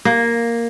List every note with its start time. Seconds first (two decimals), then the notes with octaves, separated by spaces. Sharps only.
0.05 A#3